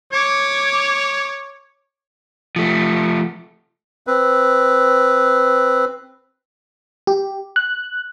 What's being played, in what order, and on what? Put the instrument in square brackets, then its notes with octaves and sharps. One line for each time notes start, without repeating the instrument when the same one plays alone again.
[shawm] C#5 [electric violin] D6 G#6
[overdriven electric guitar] F3 A3
[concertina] C4 B4
[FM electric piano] G4
F#6